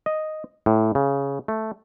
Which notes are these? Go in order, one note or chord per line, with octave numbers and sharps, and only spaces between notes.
D#5
A2
C#3
A3